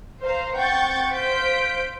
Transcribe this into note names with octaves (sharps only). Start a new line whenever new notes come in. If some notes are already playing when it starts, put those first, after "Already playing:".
C5 F5 A#5
C4 F#5 G5 C#6 G6 A6
C5 F5 G6 B6 D7